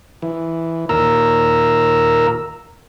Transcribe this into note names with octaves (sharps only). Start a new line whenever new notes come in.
E3
D#2 A#2 A#4 A#5 E6